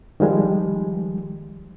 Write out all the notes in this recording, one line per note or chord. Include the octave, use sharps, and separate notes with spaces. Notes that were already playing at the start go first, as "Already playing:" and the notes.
D#3 F3 G3 G#3